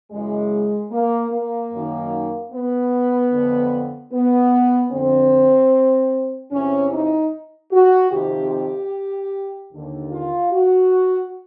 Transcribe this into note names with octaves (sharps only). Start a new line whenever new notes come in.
F#2 C#3 E3 G#3
A#3
A#3
F#2 D#3
B3
F2 D3
B3
F2 D3 C4
E2 C3 E3 C#4
D#4
F#4
F2 C3 D#3 G4
G4
D#2 D3
F4
F#4